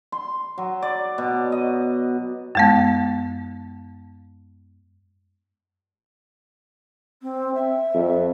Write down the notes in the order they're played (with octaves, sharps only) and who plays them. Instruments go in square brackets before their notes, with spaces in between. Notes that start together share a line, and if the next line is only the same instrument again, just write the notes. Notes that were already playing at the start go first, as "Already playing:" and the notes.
[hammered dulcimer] C6
F#3
D5
B2
D#5
[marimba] F#2 G#3 B3
[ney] C4
E5
[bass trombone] F2